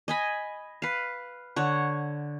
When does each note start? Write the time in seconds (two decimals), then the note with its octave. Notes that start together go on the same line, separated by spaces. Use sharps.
0.08 D#5 G#5 B5
0.82 B4 F5
1.56 D3 C#5 F#5